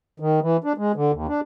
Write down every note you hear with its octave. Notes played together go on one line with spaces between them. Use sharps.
D#3
E3
D4
G#3
D3
D#2
D4